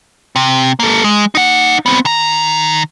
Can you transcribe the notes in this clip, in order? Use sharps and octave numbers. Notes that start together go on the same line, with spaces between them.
C3
A#3 A4
G#3
D#4 F#5
B3 C4
D#3 A#5